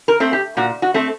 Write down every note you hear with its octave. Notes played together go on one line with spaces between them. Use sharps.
A#4
A3 C4
G4
A#2 F#4
F#4
A3 C4